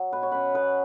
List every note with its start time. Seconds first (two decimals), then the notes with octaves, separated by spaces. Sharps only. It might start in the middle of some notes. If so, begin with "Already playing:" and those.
Already playing: F#3
0.13 B2 B4
0.23 C#5
0.32 C#4 B4
0.54 B3 B4